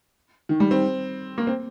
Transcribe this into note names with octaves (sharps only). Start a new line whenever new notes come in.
D#3
G3
C4
A#3
C4